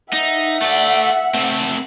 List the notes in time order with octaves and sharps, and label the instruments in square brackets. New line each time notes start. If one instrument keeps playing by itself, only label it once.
[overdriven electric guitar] D#4 [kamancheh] E5 F#5
[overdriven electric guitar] A3 D5
A3 C4